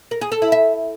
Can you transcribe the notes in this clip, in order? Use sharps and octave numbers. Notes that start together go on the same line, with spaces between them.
A#4
G#4
A4
E4
E5